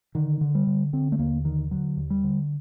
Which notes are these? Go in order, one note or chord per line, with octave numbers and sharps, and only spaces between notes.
D3 D#3
D3
G3
D3
D3 C4
A3
D#2 A#3
D3 D#3
D3 F#3
D#2
G3
D3